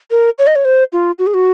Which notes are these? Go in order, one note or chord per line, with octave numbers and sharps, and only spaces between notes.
A#4
C#5
D#5
C#5
C5
F4
F#4
G#4
F#4